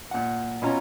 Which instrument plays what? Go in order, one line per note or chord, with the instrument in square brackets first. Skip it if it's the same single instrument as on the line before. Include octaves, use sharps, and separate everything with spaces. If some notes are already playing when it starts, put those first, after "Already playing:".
[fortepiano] A#2 F#5
B2 C#4 F4 A#5